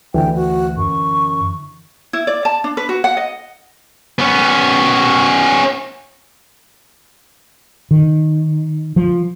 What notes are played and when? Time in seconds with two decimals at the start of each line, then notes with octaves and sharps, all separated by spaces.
0.14 D2 D3 E3 G5
0.34 F#4
0.77 F#2 C#6
2.13 E4
2.27 D5
2.45 A5
2.64 D4
2.77 B4
2.89 F#4
3.04 F#5
3.17 D#5
4.19 B3 C#4
7.91 D#3
8.96 F3